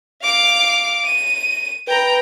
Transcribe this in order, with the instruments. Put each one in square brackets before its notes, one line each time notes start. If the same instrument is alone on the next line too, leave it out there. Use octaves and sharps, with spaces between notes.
[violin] F5 D6
D#7
[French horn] B4 [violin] G5 A#5